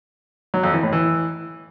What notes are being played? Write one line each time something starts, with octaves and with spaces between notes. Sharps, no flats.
F#3
F2
E3
A2
E3